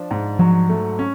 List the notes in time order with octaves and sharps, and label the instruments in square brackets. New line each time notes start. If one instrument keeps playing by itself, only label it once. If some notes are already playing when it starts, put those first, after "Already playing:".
Already playing: [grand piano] F3 D4
G#2
[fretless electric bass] F3 [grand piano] F#3
[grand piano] A3
C#4